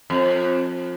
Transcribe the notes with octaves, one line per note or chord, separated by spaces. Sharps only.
F2